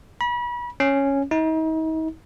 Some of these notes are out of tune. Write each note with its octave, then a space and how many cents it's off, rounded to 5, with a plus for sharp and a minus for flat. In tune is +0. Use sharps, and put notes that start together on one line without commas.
B5 -35
C#4 -5
D#4 +40